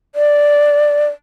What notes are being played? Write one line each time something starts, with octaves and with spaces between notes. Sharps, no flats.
D5